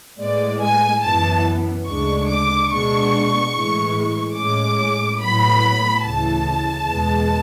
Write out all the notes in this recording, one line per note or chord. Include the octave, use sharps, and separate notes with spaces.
A2 G#3 B3 D5
G#5
F#2 E3 B3 A5
D2 C#3 G#3 D4 C#6
D6
B2 G#3 D4 C#6
A2 E3 G#3
A2 G#3 C#4 D6
A2 F#3 B3 B5
D2 C#3 E3 A5
E2 B2 G#3 B3